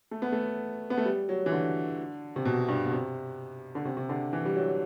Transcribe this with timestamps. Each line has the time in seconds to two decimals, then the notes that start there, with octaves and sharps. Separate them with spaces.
0.11 A3
0.22 B3
0.32 A3
0.90 B3
0.98 A3
1.05 G3
1.29 F#3
1.46 E3
1.52 D3
2.36 C3
2.45 B2
2.68 G2
2.86 B2
2.92 C3
3.75 D3
3.85 C3
3.97 C3
4.09 D3
4.33 E3
4.45 G3
4.56 F#3